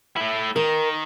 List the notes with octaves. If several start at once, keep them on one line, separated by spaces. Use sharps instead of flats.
A3 E4
D#3 A#4